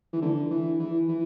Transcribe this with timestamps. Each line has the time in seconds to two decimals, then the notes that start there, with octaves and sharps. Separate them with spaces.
0.13 E3
0.22 D3
0.51 E3
0.79 E3
1.08 E3